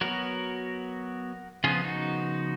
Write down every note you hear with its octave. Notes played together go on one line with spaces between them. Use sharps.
F#3 B3 F#4 A#4
C#3 F3 B3 F4 G#4
D#4 F#4